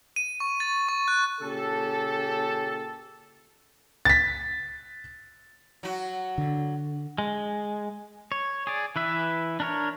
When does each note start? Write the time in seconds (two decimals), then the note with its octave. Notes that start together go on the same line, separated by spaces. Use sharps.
0.16 D#7
0.40 C#6
0.60 A6
0.89 C#6
1.08 F#6
1.42 A#2 C#3 C#4 G4 A4
4.05 A6 B6
5.83 F#3 F#4
6.38 D3
7.18 G#3
8.32 C#5
8.67 G#4 D5
8.96 E3 B4 E5
9.60 D4 A#4 C#5